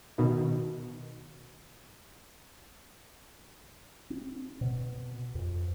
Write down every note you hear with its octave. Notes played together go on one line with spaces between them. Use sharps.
B2 D#3
C4
B2
F2